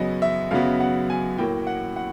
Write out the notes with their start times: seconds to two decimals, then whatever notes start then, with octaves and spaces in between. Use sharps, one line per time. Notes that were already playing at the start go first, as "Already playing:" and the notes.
Already playing: F#2 C#3 F#3 B3 D#5
0.22 E5
0.51 F#2 C#3 F#3 B3 F5
0.80 F#5
1.10 G#5
1.38 A2 F#3 A#3 G5
1.67 F#5
1.96 F#5